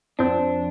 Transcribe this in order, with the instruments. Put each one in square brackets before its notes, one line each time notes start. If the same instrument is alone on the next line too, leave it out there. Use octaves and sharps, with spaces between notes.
[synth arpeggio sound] F2 F3 C4 [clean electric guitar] D4